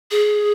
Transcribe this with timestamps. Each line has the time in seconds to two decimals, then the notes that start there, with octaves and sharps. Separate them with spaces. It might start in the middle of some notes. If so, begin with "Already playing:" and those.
0.11 G#4